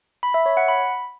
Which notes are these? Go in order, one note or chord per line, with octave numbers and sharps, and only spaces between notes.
B5
E5
C#5
F#5
B5